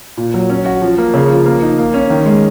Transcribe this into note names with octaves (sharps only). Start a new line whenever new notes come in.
A#2
F#3
C#4
F#4
F3
A#3
C#3
F3
A#3
D#4
A#3
C#4
D#3
G#3